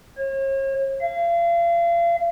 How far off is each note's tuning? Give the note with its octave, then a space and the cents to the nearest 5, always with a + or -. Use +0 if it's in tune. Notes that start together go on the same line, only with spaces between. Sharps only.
C#5 -40
F5 -35